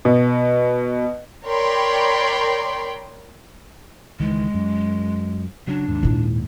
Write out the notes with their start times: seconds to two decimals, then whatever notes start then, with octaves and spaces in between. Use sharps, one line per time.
0.05 B2
1.45 A#4 C#5 D5 G5 B5 C6
4.20 C#2 D#3 E3 G#3
4.54 F#2
5.67 C#3 F#3 D4
5.88 D#2 G#2
6.03 A#2 E4